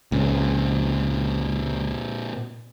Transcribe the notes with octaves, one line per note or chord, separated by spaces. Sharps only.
C#2 A#2 C4